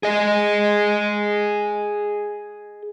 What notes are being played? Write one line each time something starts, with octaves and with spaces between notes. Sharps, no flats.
G#4 D#5